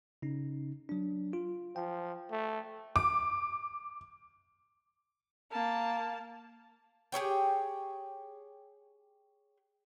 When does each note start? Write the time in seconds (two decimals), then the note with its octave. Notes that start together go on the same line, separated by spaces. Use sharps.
0.22 C#3 C#4 D#4
0.89 F#3 D4
1.33 F4
1.76 F3 G5
2.31 A3
2.96 D6
5.51 A#3 A5
7.12 G4 G#4 C#5 G5